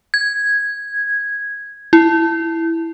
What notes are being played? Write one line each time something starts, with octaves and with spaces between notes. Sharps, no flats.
G#6
E4